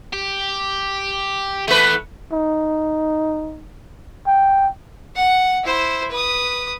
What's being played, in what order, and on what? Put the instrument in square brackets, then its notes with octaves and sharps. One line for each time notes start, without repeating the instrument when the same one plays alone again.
[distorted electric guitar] G4
[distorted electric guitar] E3 B3 [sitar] A3 B4
[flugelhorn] D#4
G5
[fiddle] F#5
E4 C5
B4 D#6